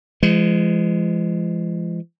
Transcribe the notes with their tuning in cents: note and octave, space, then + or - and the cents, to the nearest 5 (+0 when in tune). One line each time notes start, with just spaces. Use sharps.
F3 -45 G#3 +0